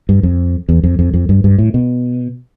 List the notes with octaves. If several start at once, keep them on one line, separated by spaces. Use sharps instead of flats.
G2
F2
E2
F2
F2
F2
G2
G2
A2
B2